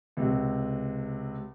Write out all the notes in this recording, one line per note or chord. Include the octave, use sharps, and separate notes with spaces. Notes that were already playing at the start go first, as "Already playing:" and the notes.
C#2 C3